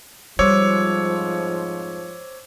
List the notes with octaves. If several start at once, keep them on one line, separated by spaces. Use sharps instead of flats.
F2 G#2 F3 G3 C5 C#5 D6 E6